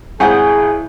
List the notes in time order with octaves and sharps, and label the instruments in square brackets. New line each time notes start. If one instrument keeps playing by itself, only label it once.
[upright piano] G#1 G6 [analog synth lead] E4 [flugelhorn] G#4 [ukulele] F#5 G#5